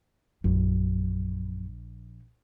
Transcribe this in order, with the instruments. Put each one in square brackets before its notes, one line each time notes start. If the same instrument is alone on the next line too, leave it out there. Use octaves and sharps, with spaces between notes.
[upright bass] A#1 [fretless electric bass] F#2